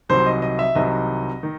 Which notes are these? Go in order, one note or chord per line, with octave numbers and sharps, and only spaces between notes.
C2 C3 D#3 F#3 C5
D#5
D#5
E5
C2 C3 D#3 F#3 D#5
D#3